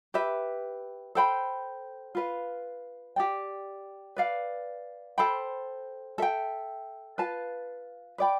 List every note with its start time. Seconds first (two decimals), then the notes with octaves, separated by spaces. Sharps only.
0.14 G4 B4 E5
1.15 A4 C5 G5 B5
2.15 F4 B4 F5
3.16 G4 D5 G5
4.16 B4 D5 F5
5.18 A4 C5 G5 B5
6.18 A4 E5 G5
7.18 F4 B4 F5 A5
8.18 B4 D5 G5 B5